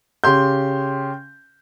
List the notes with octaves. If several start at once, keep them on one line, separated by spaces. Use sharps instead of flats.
C#3 G4 C6 G6